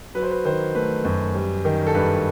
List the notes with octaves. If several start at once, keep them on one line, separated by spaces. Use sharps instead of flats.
F#3 B4
C5
B4
D#3 C5
A3 B4
F#2
G3
D#3
A4
G2 B4